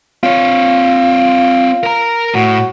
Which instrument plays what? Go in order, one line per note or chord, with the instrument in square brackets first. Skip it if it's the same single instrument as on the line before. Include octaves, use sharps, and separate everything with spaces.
[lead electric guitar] C4 C#5 [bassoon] F4
[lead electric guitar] A#4 A#5
[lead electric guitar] A2 [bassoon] F#4